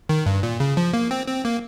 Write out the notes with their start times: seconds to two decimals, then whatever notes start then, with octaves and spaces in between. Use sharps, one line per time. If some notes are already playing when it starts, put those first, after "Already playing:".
0.09 D#3
0.26 G2
0.43 A#2
0.60 C#3
0.77 F3
0.94 A#3
1.11 C4
1.27 C4
1.45 A#3